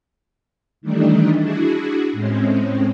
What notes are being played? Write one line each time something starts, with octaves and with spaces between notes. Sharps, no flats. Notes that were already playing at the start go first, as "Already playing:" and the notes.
D#3 E3 G3 A3 D4 D#4
D4 E4 F#4 G#4
A2 G#3 C4 C#4